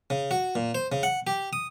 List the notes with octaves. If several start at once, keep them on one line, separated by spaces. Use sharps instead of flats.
C#3
F#4
A#2
C5
C#3
F#5
G4
D#6